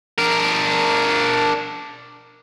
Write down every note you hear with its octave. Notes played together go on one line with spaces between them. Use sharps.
D4 A#4